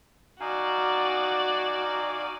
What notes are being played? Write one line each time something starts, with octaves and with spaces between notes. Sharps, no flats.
D#4 F#4 D5 F5 G#5